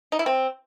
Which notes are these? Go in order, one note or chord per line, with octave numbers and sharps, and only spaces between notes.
D#4
E4
C4